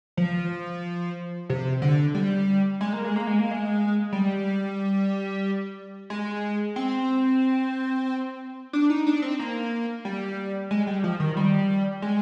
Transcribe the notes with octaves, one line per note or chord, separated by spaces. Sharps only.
F3
C3
D3
G3
G#3
A#3
G#3
A#3
G#3
A#3
G#3
G3
G#3
C4
D4
D#4
D4
C4
A#3
G3
G#3
G3
F3
D#3
G3
G#3